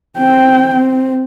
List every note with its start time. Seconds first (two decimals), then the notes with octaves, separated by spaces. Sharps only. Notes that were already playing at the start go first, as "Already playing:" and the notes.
0.18 C4 G5
0.74 C4